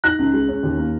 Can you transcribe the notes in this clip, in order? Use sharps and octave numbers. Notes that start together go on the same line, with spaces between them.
D#4 F#6 A#6
C#2
G#3
C#4
D#2
A#3